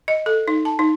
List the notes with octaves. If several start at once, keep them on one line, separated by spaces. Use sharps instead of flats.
D#5
A4
D#4
A5
D#4